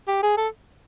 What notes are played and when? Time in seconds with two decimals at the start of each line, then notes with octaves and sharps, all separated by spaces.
0.08 G4
0.23 G#4
0.38 A4